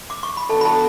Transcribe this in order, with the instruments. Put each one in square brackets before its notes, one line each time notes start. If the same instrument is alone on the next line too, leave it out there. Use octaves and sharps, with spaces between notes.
[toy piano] D6
C#6
B5
[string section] E3 B3 D4 F#4 [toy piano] A4 A5
[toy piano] B5
A4 A5